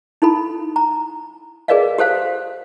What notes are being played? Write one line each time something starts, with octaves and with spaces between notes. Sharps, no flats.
D#4 E4 A4 B5
A#5
G#4 A#4 B4 D5 D#5 F5
G4 A4 C5 F5